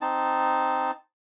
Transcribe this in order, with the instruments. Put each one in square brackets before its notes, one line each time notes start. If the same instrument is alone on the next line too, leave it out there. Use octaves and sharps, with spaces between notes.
[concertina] C4 D#4 A5